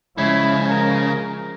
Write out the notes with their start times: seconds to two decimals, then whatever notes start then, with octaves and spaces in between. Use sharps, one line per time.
0.18 C#3 F3 G#3 E4
0.69 A#4